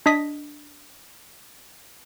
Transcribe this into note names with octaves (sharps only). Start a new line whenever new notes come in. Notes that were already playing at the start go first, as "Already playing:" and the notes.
D4 D#5 D#6 B6